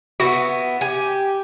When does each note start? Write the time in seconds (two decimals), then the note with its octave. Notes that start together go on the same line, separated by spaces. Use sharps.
0.20 B3 E4 F#4
0.81 G4 G#5